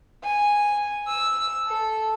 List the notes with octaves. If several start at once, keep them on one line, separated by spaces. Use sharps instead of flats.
G#5
E6
A4